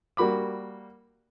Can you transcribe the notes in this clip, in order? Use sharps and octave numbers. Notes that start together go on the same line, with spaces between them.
G3 A#3 F#4 B5 D6